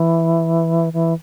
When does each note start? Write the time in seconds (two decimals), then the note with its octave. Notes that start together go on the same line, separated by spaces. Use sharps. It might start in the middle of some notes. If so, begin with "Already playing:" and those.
Already playing: E3
0.93 E3